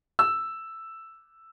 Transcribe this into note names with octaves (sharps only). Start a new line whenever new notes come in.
E6